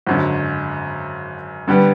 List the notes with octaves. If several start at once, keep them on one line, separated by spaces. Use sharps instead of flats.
G#1 F#2 D3
G2 D3 G3 B3